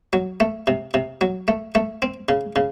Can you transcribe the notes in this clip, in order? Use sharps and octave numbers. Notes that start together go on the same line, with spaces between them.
F#3
A3
C3
C3
F#3
A3
A3
C4
C#3
C#3